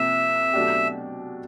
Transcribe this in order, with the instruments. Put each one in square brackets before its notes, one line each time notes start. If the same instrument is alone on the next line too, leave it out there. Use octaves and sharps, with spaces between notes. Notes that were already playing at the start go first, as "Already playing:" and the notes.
Already playing: [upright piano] C3 F3 A#3 [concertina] E5
[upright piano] B2 F#3 A3 D4 G4